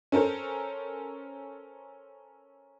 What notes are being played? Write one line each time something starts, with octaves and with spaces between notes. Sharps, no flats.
C#4 A4 A#4 C5